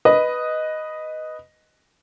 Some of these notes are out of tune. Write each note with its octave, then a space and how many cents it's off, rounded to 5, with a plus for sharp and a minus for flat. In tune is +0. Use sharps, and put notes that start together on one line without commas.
B4 +0 D#5 +0